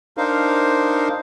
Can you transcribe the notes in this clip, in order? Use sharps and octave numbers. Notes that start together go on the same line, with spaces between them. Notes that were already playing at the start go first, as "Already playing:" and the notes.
D4 D#4 A#4 C5 F5